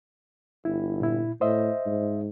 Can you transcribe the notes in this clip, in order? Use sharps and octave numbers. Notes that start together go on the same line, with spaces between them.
G1 E4
A#2 E4
A2 C5 D#5 E5
G#2